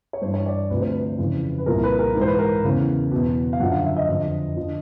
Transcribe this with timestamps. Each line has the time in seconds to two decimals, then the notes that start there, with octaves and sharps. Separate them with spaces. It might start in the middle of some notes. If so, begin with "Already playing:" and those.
0.13 C#5
0.22 G2 E3 C5
0.34 C#5
0.46 D5
0.70 D2 C3 F3 B4
0.81 C5
0.92 B4
1.19 F2 C#3 E3
1.58 B4
1.66 C2 A#2 F3 A#4
1.84 B4
1.99 A#4
2.15 G#2 E3
2.21 C5
2.27 B4
2.39 A#4
2.64 E2 C#3 E3
3.12 E2 B2
3.53 F5
3.60 F#2 D3 F3 F#5
3.72 F5
3.84 E5
3.97 D#5
4.08 F2 D3 F3
4.56 D3 F3